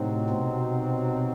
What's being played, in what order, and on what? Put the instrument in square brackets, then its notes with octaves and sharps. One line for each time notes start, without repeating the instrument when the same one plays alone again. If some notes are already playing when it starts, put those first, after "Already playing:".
Already playing: [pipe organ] A2 [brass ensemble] C3 F#3 C4 D#4
[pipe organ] B2